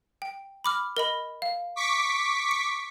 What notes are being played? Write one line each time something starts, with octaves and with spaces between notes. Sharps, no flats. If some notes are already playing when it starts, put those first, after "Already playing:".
G5
B5 D6 F6
A#4 D#5 B5
F5
C#6 D6 B6
C#7